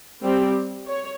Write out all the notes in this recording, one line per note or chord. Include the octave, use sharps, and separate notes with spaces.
G3 C4 G4
C#5